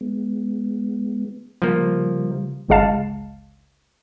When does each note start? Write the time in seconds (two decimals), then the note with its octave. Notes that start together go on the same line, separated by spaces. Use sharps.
0.01 G#3 B3
1.62 C#3 F3 G3 A#3
2.69 G1 C#2 C#3 G#3 F5 A5